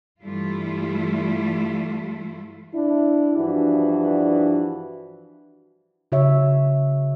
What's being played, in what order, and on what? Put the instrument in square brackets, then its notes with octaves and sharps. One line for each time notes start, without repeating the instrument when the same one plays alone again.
[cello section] G2 E3 G3 A3 E4 F4
[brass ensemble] D4 E4
G2 E3 F3 D4 F#4
[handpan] C#3 F#4 C#5 E5